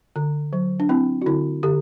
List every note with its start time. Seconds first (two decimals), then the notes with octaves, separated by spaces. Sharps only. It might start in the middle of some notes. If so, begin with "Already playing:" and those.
0.16 D3
0.53 F#3
0.80 D4
0.89 C4 E4
1.22 F#4
1.26 D3 E4
1.63 D3 G4